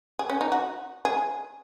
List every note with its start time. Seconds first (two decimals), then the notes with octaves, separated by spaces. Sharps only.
0.19 G#4
0.30 C#4
0.41 D#4
0.52 F#4
1.05 G#4